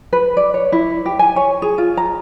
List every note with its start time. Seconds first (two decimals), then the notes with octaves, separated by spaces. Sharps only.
0.13 B4
0.37 D5
0.54 C#5
0.72 E4
1.06 G4
1.19 G#5
1.36 C#5
1.62 G#4
1.78 F4
1.97 A#5